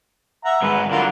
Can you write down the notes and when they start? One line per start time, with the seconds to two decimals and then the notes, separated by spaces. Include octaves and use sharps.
0.45 E5 F#5 A#5
0.62 G#2 D#3 G#3 B4
0.91 D3 F#3 G3 F4 A#4